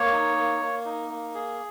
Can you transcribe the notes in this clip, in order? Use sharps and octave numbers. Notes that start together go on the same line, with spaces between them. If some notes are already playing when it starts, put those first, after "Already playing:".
Already playing: A#3 C#5
D#4
A#3
A#3
D#4
A#3
G#4